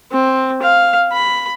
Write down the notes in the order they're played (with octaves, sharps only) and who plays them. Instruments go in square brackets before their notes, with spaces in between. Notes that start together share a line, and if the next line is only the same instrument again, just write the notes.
[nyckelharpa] C4
F5
B5